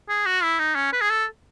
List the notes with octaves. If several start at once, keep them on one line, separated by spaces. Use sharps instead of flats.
G#4
F#4
E4
D#4
C#4
B4
G#4
A4